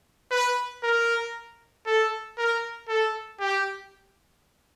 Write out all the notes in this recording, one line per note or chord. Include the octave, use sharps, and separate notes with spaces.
B4
A#4
A4
A#4
A4
G4